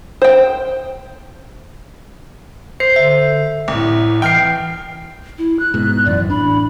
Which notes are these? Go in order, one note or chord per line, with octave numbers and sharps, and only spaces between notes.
C5 G5
C5 C7
D3 E5
C2 A2
E3 G5 F6 C7
E4
F#6
G#2 B2
G#1 F#2 E3 D5
A1 D4 B5